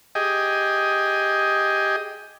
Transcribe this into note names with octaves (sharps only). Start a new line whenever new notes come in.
G4 G#4 D#5